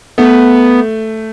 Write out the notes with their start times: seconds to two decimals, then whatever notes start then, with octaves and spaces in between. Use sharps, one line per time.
0.18 A3 B3